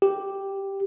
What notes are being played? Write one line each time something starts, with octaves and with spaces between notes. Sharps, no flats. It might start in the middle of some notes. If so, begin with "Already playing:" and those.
G4